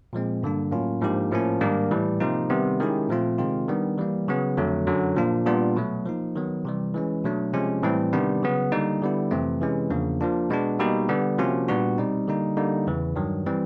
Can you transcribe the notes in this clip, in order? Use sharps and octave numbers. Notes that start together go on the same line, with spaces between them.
A#2 F3 G#3 C4
G2 D3 G3 A#3 D4
A2 F#3 A#3 C#4 F4
G#2 F3 A#3 D4 G4
A2 F3 A#3 C#4
G#2 D#3 G3 A#3 D4
A2 E3 G3
C3 F3 A#3 D#4
C3 D#3 G3 B3
D#3 G#3 C#4 E4 G4
A#2 F3 A3 C4 F4
C3 D#3 G#3 C4 F4
D#3 G3 B3 D4
E3 G3 A#3
C#3 F#3 B3
F2 D3 F#3 A3
F#2 D3 F#3
A#2 F3 A#3 D4
A#2 G3 B3 D4 F4
B2 F#3 A3
F3 A#3 D#4
D#3 F#3 B3
C3 E3 G3
E3 G#3 C#4
B2 F#3 A3 D4
C3 F3 G#3 C#4
A2 E3 G3 C4
C3 D#3 G3 B3 D4
C#3 F#3 B3
D3 G3 A#3 D#4
D3 G3 B3 E4
F2 C3 E3 A3 C4
C3 E3 G#3 C#4
E2 C#3 F3 A#3 D4
F3 A#3 D4 F4
B2 G#3 B3 D4
B2 G3 A#3 D#4 G4
D3 G3 B3
C3 F3 A#3 C#4 F#4
A#2 G3 B3 D4 F#4
B2 G3 C4 D#4
D3 G3 A#3 D#4
D3 G3 A#3 D#4
E2 C#3 E3
G2 D#3 F#3
E3 G3 C4